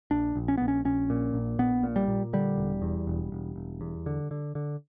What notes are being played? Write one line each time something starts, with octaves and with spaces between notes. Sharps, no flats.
A#1 D4
A#1
C#4
A#1 B3
C#4
A#1 C#4
A#2
A#1
A#1 B3
A#2
G3
A#2
D3 G3
E1
E2
E1
E1
E1
E2
D3
D3
D3